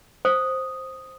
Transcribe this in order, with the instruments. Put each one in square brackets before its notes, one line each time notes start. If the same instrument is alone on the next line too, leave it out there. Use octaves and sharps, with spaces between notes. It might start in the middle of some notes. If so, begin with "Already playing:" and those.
[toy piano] C5 [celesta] D#6